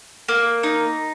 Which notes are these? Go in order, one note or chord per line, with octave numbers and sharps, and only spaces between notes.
A#3
D#4